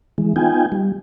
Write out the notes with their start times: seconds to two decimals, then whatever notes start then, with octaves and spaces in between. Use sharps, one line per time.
0.18 E3 G#3
0.36 B3 D#4 F4 G5 G#5
0.72 G3